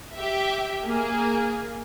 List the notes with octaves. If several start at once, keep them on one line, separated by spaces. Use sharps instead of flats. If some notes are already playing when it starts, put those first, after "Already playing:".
G4 E5
A#3 G#4